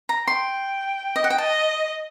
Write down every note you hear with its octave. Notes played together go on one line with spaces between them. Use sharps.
A#5
G5 C6
D#5
F#5
G5
D#5 A5